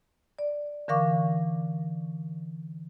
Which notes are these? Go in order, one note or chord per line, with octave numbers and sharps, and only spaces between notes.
D5
D3 E3 A#4 F5 C#6 D6